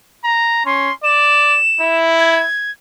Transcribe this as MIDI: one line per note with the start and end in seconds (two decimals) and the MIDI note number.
0.24 0.63 82
0.66 0.90 61
0.66 0.93 84
1.04 1.58 74
1.04 1.98 100
1.81 2.44 64
2.18 2.71 92